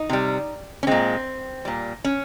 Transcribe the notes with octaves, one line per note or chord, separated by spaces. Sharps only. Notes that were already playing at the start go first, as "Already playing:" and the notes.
Already playing: D#4
C3 G3
C#4
A#2 G#3 C4
A#2 G3
C#4